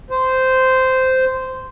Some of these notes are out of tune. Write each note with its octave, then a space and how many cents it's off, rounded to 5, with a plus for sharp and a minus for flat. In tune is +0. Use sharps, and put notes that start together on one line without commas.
C5 -10